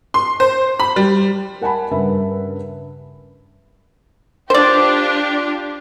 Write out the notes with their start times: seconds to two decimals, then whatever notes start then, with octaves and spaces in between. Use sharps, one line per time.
0.14 C6
0.40 C5
0.80 B5
0.96 G3
1.61 A#4 F#5 G#5 A5 B5
1.91 G2 C#3 A#4 B4 E5 B5
4.50 D4 F4 G4 C5 D5